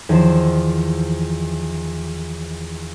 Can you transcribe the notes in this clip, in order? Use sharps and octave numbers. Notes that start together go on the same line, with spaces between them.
E2 D#3 F3 C5 E7